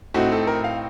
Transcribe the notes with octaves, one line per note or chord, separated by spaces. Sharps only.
A2 A3 C4 D#4 F#4
A4
A#4
F5